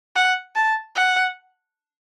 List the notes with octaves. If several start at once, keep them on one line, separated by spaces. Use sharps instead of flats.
F#5
A5
F#5